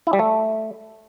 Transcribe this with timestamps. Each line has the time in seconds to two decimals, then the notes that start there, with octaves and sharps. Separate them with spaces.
0.07 E4
0.13 G3
0.19 A3